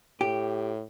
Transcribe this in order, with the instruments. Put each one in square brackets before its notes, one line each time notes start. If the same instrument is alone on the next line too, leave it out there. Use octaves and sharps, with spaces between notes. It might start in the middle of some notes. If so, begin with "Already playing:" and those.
[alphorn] A2 [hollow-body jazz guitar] G4